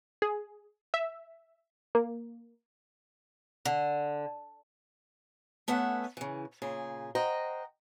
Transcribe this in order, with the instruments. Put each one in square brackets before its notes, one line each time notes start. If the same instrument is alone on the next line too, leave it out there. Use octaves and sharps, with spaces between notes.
[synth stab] G#4
E5
A#3
[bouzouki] D3
[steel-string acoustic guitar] A3 B3 C#4 E5 F#5
C#3 E3
A#2 C#3 G#4
C5 D#5 F#5 G5 A#5